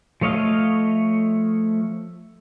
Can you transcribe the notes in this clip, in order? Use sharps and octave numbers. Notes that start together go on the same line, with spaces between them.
F3 A3 C#5 D#5 F5